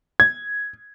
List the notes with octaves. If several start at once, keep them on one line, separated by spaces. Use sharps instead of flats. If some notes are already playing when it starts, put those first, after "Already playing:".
G#6